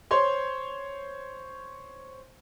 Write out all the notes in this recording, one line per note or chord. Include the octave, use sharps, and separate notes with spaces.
C5 C#5 C6